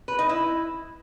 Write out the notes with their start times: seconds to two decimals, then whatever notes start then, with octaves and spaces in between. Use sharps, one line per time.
0.08 B4
0.19 D#4
0.29 E4